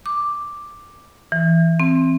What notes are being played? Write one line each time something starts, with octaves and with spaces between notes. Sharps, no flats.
D6
E3
C4